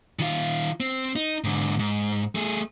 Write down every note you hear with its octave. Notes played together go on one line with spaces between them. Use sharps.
D#3 F4
C4
D#4
G#2 D3
G#2
A3 G#4